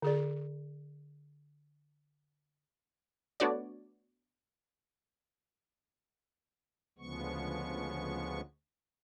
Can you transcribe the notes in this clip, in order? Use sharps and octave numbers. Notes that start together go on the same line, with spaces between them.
D3 G#4 D5
A3 B3 D4 F#4 C#5 D5
D2 C#3 F3 G#3 B3 C#6